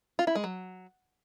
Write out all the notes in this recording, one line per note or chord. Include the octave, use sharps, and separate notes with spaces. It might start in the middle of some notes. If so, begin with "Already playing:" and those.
F4
E4
G#3
F#3